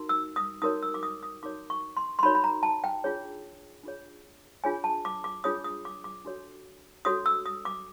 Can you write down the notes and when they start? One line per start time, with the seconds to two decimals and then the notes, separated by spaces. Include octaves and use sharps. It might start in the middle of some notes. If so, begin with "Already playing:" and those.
Already playing: D#4 F#4 A#4
0.09 E6
0.36 D#6
0.62 D#4 F#4 A#4 C#5 D#6
0.83 E6
0.94 D6
1.03 D#6
1.23 D#6
1.43 D#4 F#4 A#4 C#5 D6
1.70 C#6
1.97 C6
2.19 C6
2.23 D#4 F#4 A#4 C#5 B5
2.35 B5
2.44 A#5
2.63 A5
2.84 G5
3.04 D4 F4 G#4 C#5
3.83 D4 F4 G#4 C#5
4.64 D4 F4 G#4 C#5 G#5
4.84 A5
5.05 D6
5.24 D6
5.44 D4 F4 G#4 C#5 D#6
5.64 D#6
5.85 D6
6.04 D6
6.25 D4 F#4 A4 C#5
7.05 D4 F#4 A4 C#5 D#6
7.26 E6
7.46 D#6
7.65 D6